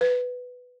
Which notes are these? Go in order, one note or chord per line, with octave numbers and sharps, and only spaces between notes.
B4